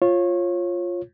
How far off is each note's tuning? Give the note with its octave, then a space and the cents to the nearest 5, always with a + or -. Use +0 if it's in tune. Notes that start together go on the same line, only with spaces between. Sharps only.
F4 +0 C#5 -25